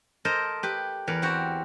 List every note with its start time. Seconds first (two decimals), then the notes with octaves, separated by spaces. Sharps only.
0.25 A4 A#4 C5 D#5
0.63 G4 B4
1.08 E2 A#4 B4
1.22 C4 F#4 G4